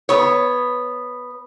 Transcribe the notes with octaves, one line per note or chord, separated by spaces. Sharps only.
B3 C#5